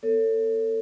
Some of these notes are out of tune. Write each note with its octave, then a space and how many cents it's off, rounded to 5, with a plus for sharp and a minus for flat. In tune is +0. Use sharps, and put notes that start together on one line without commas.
B3 +0 A4 +30 C#5 +0